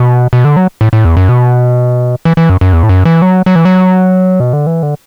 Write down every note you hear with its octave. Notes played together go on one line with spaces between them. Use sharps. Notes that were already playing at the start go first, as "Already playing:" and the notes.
Already playing: B2
B2
D3
F#3
A2
A2
E2
F#2
B2
E3
E3
F#2
F#2
E2
A2
F#2
E3
F#3
F#3
E3
F#3
B2
D3
E3
D3